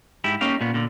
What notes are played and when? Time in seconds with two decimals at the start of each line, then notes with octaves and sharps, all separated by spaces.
0.24 G#2 E4 G4
0.41 A#3 C#4 D#4 G4 F5
0.61 A#2 B3
0.74 A#2 D3